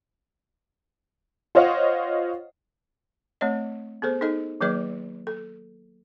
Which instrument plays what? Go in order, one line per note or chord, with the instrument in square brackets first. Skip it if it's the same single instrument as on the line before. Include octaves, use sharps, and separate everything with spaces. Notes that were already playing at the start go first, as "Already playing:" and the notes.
[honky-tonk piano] F4 C5 C#5 D#5 F5 F#5
[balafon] A3 C4 C#5 D#5
B3 G#4 A4 C5
D#4 G#4 A4 D#5
D#3 F#3 A#3 G#4 B4 D#5
A4